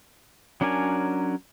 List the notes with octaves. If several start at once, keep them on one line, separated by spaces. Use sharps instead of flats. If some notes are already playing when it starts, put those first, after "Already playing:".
F#3 C#4 D4 A#4 G#5